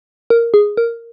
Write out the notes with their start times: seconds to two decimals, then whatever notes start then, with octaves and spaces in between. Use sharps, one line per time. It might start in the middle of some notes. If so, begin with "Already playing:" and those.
0.30 A#4
0.54 G#4
0.77 A#4